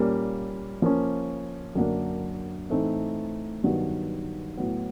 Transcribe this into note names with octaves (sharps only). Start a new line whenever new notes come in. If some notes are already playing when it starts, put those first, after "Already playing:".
Already playing: A#2 G3 A#3 C#4
F3 A#3 C#4
F#2 D3 F#3 A#3 D4
A2 E3 A3 C4 D#4
G2 D#3 F#3 B3
A2 F#3 B3